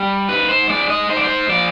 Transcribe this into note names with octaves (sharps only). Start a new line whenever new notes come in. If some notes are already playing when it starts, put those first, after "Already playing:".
Already playing: G3
G#2 B4
C5
G#3 D5
D#5
G#2 C5
D5
C5
F3 D5